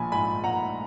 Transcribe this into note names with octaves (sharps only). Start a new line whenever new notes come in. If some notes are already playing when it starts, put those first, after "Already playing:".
Already playing: A#1 F3 G#5 B5
G#2 G#5 B5
A#1 F#5 A#5